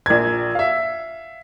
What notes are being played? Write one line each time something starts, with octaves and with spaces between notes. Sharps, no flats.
A#1 A#4 G#6
E5 F5